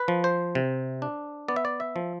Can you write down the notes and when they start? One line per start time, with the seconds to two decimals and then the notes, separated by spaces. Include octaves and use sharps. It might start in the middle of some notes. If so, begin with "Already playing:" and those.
Already playing: B4
0.08 F3
0.24 C5
0.55 C3
1.02 D4
1.48 B3 D5
1.56 E5
1.65 D5
1.80 E5
1.96 F3